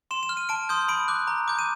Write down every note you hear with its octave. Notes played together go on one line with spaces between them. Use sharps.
C6 E7
E7
F6
D#7
A5 D7
C6 D#6 G6
B5 D7
D6 F#6
A#5
D6 G6
D#7